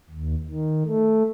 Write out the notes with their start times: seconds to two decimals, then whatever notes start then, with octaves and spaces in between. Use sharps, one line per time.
0.10 D#2
0.49 D#3
0.86 A3